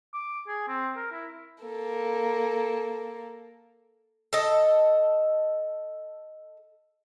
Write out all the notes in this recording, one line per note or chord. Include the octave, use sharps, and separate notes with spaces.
D6
G#4
C4
A#4
E4
A#3 A4
A4 D#5